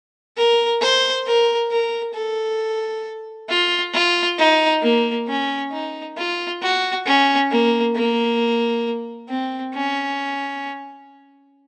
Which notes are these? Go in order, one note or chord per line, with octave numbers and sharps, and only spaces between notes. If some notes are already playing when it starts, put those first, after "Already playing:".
A#4
C5
A#4
A#4
A4
F4
F4
D#4
A#3
C#4
D#4
F4
F#4
C#4
A#3
A#3
C4
C#4